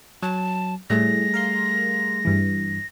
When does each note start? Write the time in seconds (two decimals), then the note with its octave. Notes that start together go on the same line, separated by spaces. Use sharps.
0.23 F#3 A5
0.90 A2 G3 A3 G#4 A#6
1.34 A#4 F5 C6
2.25 G2 E3